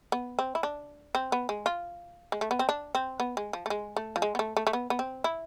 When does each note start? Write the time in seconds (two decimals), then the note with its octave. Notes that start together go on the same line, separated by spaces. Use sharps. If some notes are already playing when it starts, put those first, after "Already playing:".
0.12 B3
0.39 C4
0.55 E4
0.63 D4
1.15 C4
1.32 B3
1.49 G#3
1.66 F4
2.32 G#3
2.41 A3
2.51 B3
2.59 C4
2.69 D4
2.95 C4
3.20 B3
3.37 G#3
3.53 F3
3.66 A3
3.70 G#3
3.97 A3
4.16 F3
4.22 G#3
4.35 B3
4.39 A3
4.57 A3
4.67 A3
4.73 B3
4.90 B3
4.99 C4
5.24 E4